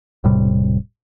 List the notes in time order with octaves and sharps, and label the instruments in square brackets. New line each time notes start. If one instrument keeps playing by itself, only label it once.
[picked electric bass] E1 A2 C3 G3